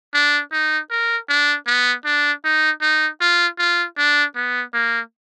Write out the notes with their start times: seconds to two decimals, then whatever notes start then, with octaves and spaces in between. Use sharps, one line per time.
0.14 D4
0.52 D#4
0.90 A#4
1.29 D4
1.67 B3
2.05 D4
2.44 D#4
2.81 D#4
3.20 F4
3.58 F4
3.97 D4
4.35 B3
4.73 A#3